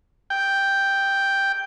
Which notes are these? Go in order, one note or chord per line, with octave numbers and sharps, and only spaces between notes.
G5